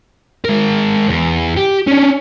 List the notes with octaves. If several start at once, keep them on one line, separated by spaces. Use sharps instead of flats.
G#3 A#4
E2
G4
C#4 D4